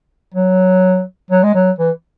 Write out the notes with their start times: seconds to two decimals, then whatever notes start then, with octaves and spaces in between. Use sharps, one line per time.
0.34 F#3
1.31 F#3
1.43 G#3
1.55 F#3
1.79 E3